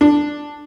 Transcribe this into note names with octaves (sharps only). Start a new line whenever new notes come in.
D4